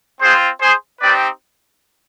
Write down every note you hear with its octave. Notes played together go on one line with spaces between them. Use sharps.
C4 F4 G#4 C5
G#4 C5
C4 D#4 G4 B4 D5